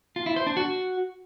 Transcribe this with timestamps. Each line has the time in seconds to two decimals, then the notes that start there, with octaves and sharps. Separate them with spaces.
0.16 F4
0.26 E4
0.36 C5
0.47 D4
0.57 F#4